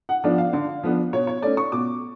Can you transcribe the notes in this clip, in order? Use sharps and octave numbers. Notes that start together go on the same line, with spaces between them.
F#5
F3 B3 D4 D5
F5
D3
F3 B3 D4
B2 C#5
C#5
A3 C#4 D5
C#6
B2 D6